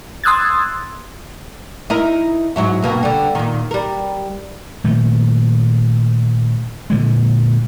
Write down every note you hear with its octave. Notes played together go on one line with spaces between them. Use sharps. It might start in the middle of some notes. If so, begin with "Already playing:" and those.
C6 D#6 E6 F#6 G#6 A6
D#4 E4 A#4
G#2 F#3 E4
G2 B2 A#3
D3 G3
A#2 D#3
G3 A#4
A#2 D#3 A3
A#2 D3 G#3